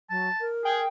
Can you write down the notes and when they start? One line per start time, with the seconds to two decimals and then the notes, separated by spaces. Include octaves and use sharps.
0.10 F#3 A5
0.41 A#4
0.65 G#4 G5